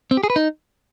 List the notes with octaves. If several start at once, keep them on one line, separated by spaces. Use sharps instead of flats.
C4
G4
G#4
B4
D#4